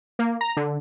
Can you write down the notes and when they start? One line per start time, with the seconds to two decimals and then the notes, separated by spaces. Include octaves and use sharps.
0.19 A#3
0.41 A#5
0.57 D3